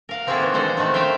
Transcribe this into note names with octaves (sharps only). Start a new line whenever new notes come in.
A#4 F5 F#5
A#3 C4 E4 F#4 G#4 A4
D#3 E3
B2 D3 G#3 A4 C5 F#5
D#3 A3 C4 F#4
C#3 C5 E5 F5 G5